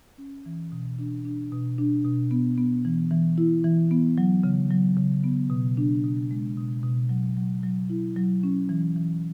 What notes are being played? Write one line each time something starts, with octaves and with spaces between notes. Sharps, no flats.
C#4
E3
B2
D4
D4
B2
D4
B2
B3
B3
E3
E3
E4
E3
B3
F#3
C#3
F#3
C#3
B3
B2
D4
B2
G#3
B2
B2
F#3
F#3
F#3
E4
F#3
C#4
E3
E3